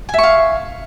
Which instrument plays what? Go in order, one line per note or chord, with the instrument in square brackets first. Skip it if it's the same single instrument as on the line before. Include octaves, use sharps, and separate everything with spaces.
[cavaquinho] G#5
E5
C#6
F5